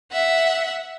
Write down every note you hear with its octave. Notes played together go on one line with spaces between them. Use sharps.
E5 F#5